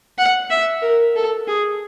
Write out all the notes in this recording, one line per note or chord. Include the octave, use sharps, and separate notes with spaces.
F#5
E5
A#4
A4
G#4